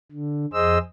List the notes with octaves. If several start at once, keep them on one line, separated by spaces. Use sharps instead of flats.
D3
F2 G#4 C5 D#5 E6